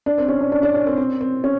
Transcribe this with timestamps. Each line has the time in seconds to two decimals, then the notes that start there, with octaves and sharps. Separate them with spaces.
0.06 D4
0.18 C4
0.28 C#4
0.41 D4
0.52 D4
0.63 D4
0.74 C#4
0.87 C4
0.97 C4
1.21 C4
1.44 C#4